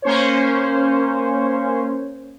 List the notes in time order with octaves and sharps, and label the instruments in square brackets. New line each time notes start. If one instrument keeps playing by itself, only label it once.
[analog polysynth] A#3 C#4 C5 C#5